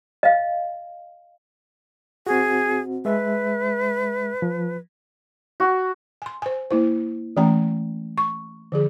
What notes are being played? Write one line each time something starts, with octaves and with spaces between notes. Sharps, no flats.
D#5 F5
C4 F#4 G#4
G#3 B4 E5
F3
F#4
G#5 C6
C5 G#5
A#3 E4 C5
E3 A3 C#4 G5 A#5
C#6
D3 F3 G#4